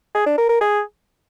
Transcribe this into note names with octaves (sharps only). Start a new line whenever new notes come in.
G#4
D4
A#4
A#4
G#4